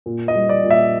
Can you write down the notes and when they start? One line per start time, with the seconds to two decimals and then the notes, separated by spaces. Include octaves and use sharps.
0.06 A#2
0.28 D#5
0.35 G3
0.49 D5
0.64 A#2
0.71 E5